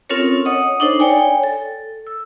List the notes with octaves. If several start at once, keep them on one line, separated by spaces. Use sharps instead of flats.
C4 C#4 F4 A4 A#4 C#5
C#5 D#5 F#5 D#6
D4 D#4 A4 C5
C#5 D5 G5 G#5
A4
E6